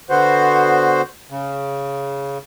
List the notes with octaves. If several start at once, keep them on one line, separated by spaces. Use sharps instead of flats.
D3 B3 F#4 C5
C#3